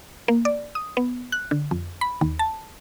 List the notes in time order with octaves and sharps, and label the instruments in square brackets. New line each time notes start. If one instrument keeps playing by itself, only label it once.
[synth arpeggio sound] A#3
D5
D#6
B3
F#6
D3
F2
B5
D#2
A5